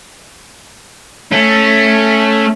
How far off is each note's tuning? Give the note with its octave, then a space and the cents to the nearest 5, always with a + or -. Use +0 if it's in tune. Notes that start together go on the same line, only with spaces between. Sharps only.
A3 +0 C#4 -5